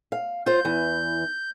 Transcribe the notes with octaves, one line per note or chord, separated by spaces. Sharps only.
F5
F4 C5 G6
E2 E3